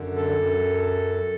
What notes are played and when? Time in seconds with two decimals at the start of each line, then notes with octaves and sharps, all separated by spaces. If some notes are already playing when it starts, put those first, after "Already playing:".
Already playing: F#2 D3
0.16 A4
0.39 F#2